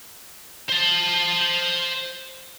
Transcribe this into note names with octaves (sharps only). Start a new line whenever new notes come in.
C5 A5